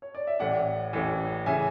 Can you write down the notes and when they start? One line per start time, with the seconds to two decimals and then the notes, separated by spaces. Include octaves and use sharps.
0.02 C#5
0.15 D5
0.27 E5
0.39 A1 A2 E3 D5 F#5
0.93 A1 A2 E3
1.46 C#3 E3 E5 G#5